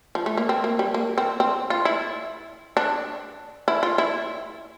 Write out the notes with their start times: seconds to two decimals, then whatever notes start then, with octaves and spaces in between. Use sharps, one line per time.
0.15 F3
0.26 A3
0.37 A#3
0.49 C4
0.64 A#3
0.79 G3
0.94 A#3
1.18 C4
1.40 C4
1.70 F4
1.85 E4
2.77 D4
3.68 E4
3.83 F4
3.98 E4